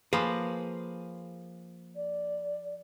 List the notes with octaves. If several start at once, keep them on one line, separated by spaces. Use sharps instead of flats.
F3 A#3 G#4 B4
D5